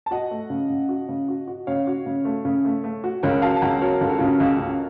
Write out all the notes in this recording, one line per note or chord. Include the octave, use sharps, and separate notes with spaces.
A5
F#4 D#5 F#5
A3
C#3
C#3
F#4
C#3
F#4
F#4
C#3 C#5 F5
F#4
C#3
A3
C#3
A3
A3
F#4
C#2 A#4 C#5
F#3 F5 A5
A5
C#2 F#5 A#5
F#3 A#4 C#5
C#2 A4
F#4
C#3 F4
F#4
C#2
C#3